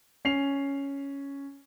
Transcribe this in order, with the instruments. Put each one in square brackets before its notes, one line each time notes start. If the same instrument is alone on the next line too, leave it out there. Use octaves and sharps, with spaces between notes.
[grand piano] C#4 C7 F7